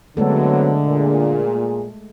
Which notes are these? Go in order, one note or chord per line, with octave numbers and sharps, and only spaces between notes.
D3 F#3 G#3 A3 B3 C4 A4
A#2 G#4